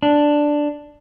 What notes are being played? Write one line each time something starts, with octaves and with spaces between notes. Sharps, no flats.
D4